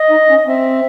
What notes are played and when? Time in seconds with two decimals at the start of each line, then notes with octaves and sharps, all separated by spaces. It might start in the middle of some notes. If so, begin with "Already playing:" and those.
Already playing: D#5
0.10 D#4
0.29 C#4
0.47 C4 E5